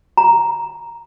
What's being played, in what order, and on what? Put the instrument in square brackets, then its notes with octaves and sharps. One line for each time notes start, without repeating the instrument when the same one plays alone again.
[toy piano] A#5